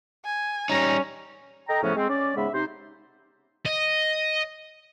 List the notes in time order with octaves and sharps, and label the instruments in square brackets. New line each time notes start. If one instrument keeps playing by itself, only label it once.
[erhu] G#5
[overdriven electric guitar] G3 D#4 [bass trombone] C#4 [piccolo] A#5
[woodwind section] A4 D#5 G5 A#5
A2 C#3 F3 A3 B3 C#4
G#3 C4
C#4 D5
G#2 C#3 G#3 B3 E5 B5
C3 D#4 C5
[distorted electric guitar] D#5